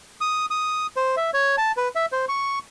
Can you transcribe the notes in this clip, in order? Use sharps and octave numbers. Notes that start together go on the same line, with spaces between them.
D#6
D#6
C5
E5
C#5
A5
B4
E5
C5
C#6